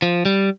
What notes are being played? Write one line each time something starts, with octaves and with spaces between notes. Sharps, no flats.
F3
G3